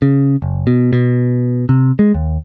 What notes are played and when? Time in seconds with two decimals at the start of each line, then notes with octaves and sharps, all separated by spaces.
0.02 C#3
0.42 F#1
0.67 B2
0.93 B2
1.69 C3
1.99 G#3
2.14 D#2